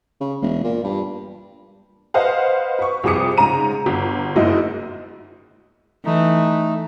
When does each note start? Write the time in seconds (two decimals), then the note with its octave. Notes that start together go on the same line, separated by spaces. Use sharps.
0.21 C#3
0.42 E1
0.64 A#2
0.84 G2
2.14 B4 C5 D#5 F5 F#5
2.79 B4 C#6
3.04 C2 F2 G#4 D6 D#6 C#7
3.37 G#2 C#3 A#5 D#7
3.86 G1
4.36 F#1 G#2 E4 F#4 D#5
6.06 E3 A3 D#4